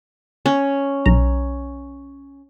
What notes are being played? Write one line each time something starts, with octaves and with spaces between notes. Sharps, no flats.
C#4
B1 A#5